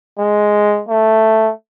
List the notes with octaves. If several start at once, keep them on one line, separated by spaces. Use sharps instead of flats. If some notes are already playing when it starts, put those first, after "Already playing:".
G#3
A3